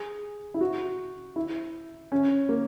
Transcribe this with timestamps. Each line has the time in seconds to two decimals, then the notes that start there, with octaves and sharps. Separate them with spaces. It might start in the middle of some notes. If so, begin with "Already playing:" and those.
Already playing: G#4
0.54 E4
0.61 F#4
1.36 E4
2.12 C#4
2.49 A#3